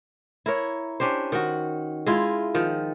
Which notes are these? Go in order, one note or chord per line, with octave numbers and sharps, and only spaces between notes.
E4 A#4 C#5
C#4 D4 G4 C5
D#3 F#4
G#3 E4 F4
D#3 F3